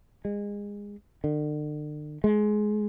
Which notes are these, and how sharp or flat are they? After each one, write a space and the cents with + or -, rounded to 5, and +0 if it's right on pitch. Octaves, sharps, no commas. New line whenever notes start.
G#3 -25
D3 +40
G#3 +20